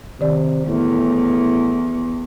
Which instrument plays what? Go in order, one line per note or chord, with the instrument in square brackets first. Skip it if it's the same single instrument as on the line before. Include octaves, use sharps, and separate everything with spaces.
[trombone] C3 [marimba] D#3 D5
[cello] E2 [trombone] A2